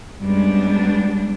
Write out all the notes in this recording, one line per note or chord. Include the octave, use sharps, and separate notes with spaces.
F#2 G3 G#3 B3 D4